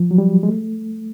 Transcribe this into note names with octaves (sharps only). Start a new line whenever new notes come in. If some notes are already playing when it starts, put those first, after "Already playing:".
Already playing: F3
F#3
G3
G#3
A3